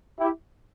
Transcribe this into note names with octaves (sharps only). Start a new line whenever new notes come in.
E4 G4